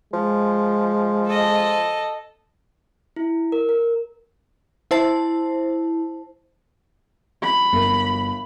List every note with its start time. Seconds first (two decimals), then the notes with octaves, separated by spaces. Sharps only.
0.13 F3 G#3
1.26 A4 D#5
3.16 E4
3.52 A#4
3.69 A#4
4.91 E4 C5 A5
7.43 B5
7.73 G1 A#4